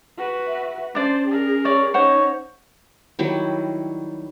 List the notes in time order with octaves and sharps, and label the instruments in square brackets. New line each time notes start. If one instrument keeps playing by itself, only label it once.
[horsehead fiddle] F#4 B4
[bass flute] E5
[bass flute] C#4 [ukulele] D4 D5 [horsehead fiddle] C5
[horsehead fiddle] G#4 A#4
[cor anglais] C#5 [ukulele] D5
[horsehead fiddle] C#4 D#4 [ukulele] C5 F#5 [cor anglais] C#5
[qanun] D#3 F#3 G3 E4